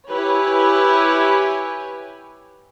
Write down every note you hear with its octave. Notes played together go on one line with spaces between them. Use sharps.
E4 G4 B4 C#5 G#5